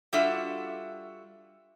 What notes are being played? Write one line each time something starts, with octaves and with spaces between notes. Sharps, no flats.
G3 D4 F4 F#4 A4 E5